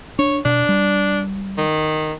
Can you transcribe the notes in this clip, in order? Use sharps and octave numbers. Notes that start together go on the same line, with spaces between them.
D4 C#5
B2 D4
G3
D#3